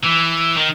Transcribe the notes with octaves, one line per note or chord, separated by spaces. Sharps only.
E3
D#3